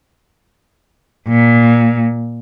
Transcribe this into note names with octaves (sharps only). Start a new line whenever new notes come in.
A#2